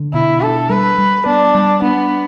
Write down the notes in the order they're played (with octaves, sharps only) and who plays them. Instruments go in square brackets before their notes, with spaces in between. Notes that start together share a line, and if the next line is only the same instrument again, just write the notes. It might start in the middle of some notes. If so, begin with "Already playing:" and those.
Already playing: [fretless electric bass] D3
[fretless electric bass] B2 [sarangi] E4
[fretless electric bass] D4 [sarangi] A4
[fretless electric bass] G3 [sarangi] B4
[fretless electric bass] G3
[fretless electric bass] B3 [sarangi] D4
[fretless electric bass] G3
[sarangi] B3 [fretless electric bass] D4